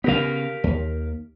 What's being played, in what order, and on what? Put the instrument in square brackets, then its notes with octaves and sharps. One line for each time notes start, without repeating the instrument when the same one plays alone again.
[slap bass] C#3 B3 [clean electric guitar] G4 A#4 F5
[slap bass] D#2